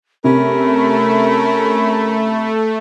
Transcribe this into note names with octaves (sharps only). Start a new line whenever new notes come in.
C3 A3 C#4 A#4 B5